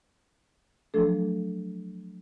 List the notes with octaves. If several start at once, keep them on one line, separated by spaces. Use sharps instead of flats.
F3 F#3 A3 D4 A4